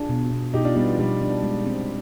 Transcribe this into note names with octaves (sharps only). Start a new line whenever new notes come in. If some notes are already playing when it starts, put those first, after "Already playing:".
Already playing: D4 F4 G#4
B2
B2
B2 D#4 G4
D4 F4
G3 B3
F3
B2 G3
D4
G#3
C4